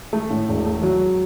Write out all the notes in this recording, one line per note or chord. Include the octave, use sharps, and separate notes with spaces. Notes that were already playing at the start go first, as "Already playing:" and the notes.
A3
A2
E1
A3
F#3